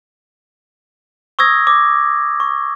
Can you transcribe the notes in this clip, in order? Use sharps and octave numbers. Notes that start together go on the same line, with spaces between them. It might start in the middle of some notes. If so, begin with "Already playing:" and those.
C#6 D#6 E6 G#6 A#6
D6
C#6